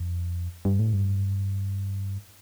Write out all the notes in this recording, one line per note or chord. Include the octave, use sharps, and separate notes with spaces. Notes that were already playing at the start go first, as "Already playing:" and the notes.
Already playing: F2
G2
A2
G2